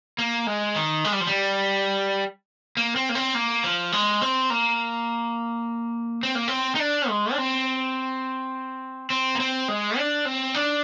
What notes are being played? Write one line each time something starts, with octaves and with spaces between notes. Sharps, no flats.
A#3
G#3
D#3
G#3
G3
F3
G3
A#3
C4
A#3
C4
A#3
F3
G#3
C4
A#3
C4
A#3
C4
D#4
D4
G#3
D4
C4
C4
A#3
C4
G#3
D4
C4
D4